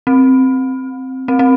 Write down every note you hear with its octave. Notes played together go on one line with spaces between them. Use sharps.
C4
C4
C4